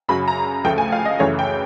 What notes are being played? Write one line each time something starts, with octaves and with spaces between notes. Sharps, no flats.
F#2 C#3 F#3 B5
A#5
D2 C#3 F3 A3 G5
G#5
F5
D#5
F#2 C#3 E3 A3 C#5
G5